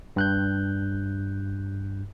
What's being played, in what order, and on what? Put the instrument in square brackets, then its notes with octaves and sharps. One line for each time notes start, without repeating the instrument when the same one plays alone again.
[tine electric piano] G2 F#6 G6